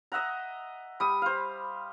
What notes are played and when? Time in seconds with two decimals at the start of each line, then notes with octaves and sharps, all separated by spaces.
0.12 D#5 E5 F#5 A#5
1.00 G3 D#6
1.22 C5 F5